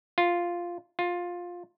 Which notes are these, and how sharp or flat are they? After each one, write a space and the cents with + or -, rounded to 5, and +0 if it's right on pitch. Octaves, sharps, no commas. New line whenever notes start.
F4 +0
F4 +15